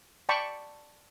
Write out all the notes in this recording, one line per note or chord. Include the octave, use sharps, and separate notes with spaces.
D5 G5 A5 B5 C#6